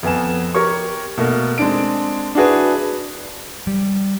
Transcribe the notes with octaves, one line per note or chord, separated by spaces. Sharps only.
F2 B3 G#5 E7
G4 A#4 C#5 C#6
B2 A3 A#3
G#3 C4 D4 D7
D4 E4 F#4 G#4 B4
G3